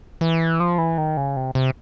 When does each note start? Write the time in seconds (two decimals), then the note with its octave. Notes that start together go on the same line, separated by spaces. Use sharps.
0.21 E3
0.60 F3
0.78 E3
0.98 D#3
1.17 C#3
1.37 C3
1.55 C3